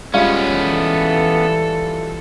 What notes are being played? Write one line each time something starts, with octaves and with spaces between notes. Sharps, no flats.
G3 G#3 B3 C#4 F4
E3 A4